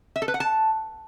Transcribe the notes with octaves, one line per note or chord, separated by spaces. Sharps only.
E5
A4
B4
F#5
A5